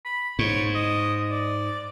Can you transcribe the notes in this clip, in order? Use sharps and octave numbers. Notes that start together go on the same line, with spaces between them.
B5
G#2 C#5
D#5
D5